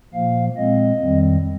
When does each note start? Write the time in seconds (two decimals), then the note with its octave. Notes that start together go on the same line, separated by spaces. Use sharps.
0.14 A#2 F3 A#3 F5
0.57 A#2 G#3 C4 D#5
1.01 F2 D#3 G3 C4